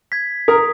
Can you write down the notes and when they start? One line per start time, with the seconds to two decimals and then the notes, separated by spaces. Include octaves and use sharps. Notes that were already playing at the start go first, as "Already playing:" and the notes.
0.12 G#6 B6
0.48 A#4 D#6